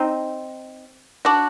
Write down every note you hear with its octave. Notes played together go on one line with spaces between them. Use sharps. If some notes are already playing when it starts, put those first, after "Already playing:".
Already playing: C4 D#4
D4 F#4